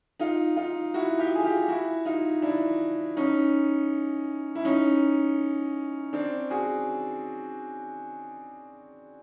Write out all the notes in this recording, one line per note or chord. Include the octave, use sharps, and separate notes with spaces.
D#4 F4
D#4 F4
E4 F#4
F4 G4
G#4
F4 G4
E4 F#4
D#4 F4
D4 E4
C#4 D#4
E4
C#4 D#4
C4 D4
F#4 G#4